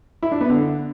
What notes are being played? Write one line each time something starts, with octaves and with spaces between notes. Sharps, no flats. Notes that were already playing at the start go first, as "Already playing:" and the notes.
E4
D4
B3
D3